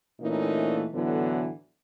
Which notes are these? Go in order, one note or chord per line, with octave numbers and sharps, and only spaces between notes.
A#2 E3 A3 A#3 C#4 D#4
A2 D3 E3 F#3 B3 A4